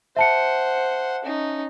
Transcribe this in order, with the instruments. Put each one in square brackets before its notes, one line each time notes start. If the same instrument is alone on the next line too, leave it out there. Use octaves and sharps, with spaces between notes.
[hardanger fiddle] C5 F#5 [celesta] E5 A5 C#7
[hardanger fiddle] C#4 D#4